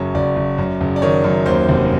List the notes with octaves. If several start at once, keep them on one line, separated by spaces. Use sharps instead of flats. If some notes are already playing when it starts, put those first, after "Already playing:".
Already playing: F#1 F#2 C#5
F#1 D5
F#1
F#2
F#1
D5
D#3 C#5
F#2
D#2 C5
F1